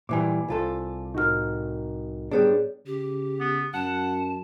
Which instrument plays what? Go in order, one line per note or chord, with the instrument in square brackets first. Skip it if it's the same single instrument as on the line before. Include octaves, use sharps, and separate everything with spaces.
[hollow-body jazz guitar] A#2 E3 G3 [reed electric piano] G#5 D6
[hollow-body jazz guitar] C2 F4 A4
[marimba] A2 F6 [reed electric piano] D#4 F#4 A#4
[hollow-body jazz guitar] G3 B3 D4 [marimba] G#4 C#5 D5
[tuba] C#3 [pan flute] G4
[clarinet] B3
[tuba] F#2 [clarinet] F#5 [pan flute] A5